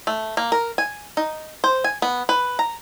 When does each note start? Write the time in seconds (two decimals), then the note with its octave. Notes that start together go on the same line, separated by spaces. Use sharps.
0.07 A3
0.37 A#3
0.52 A#4
0.78 G#5
1.17 D#4
1.64 C5
1.84 G#5
2.02 B3
2.29 B4
2.59 A#5